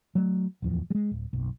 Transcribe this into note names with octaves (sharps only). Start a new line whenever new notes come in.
F#3 A3
D1 E2 F3
G3 G#3
D1
F#1 B1